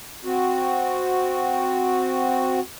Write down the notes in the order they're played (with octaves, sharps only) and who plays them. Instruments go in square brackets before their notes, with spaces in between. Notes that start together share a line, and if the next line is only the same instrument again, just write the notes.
[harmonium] C4 F#4